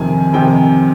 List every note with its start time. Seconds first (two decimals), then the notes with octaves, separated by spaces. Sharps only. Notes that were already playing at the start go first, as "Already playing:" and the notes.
Already playing: F2 C3 D#3 G#5
0.33 F2 C3 D#3 G5